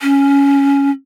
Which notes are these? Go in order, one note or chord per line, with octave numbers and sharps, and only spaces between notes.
C#4